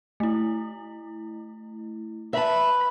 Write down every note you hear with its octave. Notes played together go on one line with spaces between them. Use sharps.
A3 E4
B4 E5 A5 B5